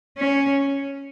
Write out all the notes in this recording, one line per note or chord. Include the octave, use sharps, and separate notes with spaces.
C#4